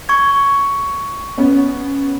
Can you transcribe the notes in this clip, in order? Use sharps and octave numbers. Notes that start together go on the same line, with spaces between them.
C#6 G#6
B3 C#4